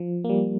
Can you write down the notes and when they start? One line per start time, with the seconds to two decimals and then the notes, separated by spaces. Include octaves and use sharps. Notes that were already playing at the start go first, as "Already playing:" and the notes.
Already playing: F3
0.24 A#3
0.29 G3